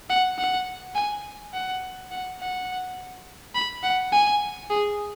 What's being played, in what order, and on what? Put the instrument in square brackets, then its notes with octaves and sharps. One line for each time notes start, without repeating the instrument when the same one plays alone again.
[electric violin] F#5
F#5
G#5
F#5
F#5
F#5
B5
F#5
G#5
G#4